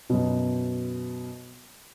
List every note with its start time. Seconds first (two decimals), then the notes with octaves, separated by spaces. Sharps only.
0.10 F#2 B2